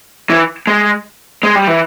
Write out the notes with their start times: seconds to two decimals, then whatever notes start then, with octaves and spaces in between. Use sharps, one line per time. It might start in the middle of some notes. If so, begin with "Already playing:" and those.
0.30 E3
0.67 G#3
1.43 G#3
1.55 G3
1.67 E3